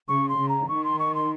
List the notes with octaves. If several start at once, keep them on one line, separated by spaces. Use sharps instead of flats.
C#3 C#6
C6
C#3
A#5
D#3 C#6
C6
C#6
C6